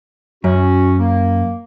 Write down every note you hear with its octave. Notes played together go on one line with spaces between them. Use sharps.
F#2 C#4 F#4
A#3